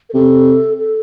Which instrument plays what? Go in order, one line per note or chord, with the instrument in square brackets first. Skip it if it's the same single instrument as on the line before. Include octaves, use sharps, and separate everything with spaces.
[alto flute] A#4
[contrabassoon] C3 [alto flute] A4
[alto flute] A4